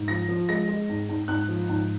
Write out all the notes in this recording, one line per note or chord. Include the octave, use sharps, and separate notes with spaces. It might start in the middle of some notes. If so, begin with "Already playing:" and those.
Already playing: G#2
F3 A#6
F3
G#3 A#6
G#3
G#2
G#2
G#2 F#6
F3
G#2